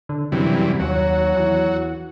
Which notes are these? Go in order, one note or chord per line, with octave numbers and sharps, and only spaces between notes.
D3
F#2 C3 E3 G3
D#2 F#3 F#4
E2